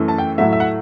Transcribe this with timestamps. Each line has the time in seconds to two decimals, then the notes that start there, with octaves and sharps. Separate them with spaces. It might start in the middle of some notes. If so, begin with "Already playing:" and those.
Already playing: F#2 E3 A3
0.08 A5
0.18 G5
0.38 A2 F#3 A3 E5
0.53 E5
0.60 F#5